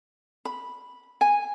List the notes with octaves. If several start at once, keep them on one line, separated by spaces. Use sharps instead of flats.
B5
G#5